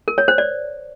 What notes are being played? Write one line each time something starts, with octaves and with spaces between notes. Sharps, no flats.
A#4
C#5
C5
D5